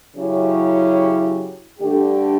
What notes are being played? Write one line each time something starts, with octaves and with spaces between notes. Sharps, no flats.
C#3 F#3 C#4 E4 G4
G2 D3 A3 D4 G4